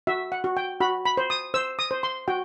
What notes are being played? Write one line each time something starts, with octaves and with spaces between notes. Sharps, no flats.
F#4 E5
F#5
F#4
G5
F#4 B5
B5
C5
D#6
C5 E6
D#6
C5
C6
F#4 G5